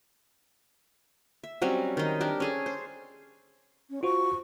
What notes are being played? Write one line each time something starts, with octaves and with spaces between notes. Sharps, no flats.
E5
F#3 G3 C4 C#4
D#3 D#4
D4 G4 A#4
C#4 G#4 A4
C5
C#4
F4 F#4 C5 C#6